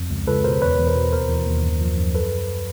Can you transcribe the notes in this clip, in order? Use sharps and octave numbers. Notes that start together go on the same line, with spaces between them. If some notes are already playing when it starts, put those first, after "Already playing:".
Already playing: F2
C#2
C#2 A4 B4
B2 A#4 C5
E2 B4 C#5
E2
A#4 C5
B2
D#2 A#4 C5
E3
D#2
F#2
F3
F#2
A4 B4